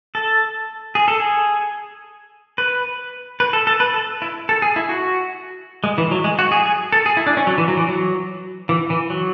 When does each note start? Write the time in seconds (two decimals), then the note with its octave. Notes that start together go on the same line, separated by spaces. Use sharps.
0.15 A4
0.95 G#4
1.08 A4
1.20 G#4
2.58 B4
3.40 B4
3.53 A4
3.67 A4
3.80 B4
3.94 A4
4.22 E4
4.49 A4
4.62 G#4
4.76 E4
4.89 F#4
5.84 G#3
5.98 E3
6.11 F#3
6.24 G#3
6.39 F#4
6.52 G#4
6.66 G#4
6.93 A4
7.06 G#4
7.17 E4
7.27 D4
7.37 C#4
7.47 F#3
7.58 E3
7.68 F#3
7.77 E3
7.88 F#3
8.69 E3
8.90 E3
9.10 F#3